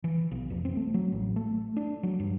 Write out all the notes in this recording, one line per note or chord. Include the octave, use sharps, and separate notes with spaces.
E3
B1
F1
C4
A3
F#3
A1
A3
D4
F#3
G2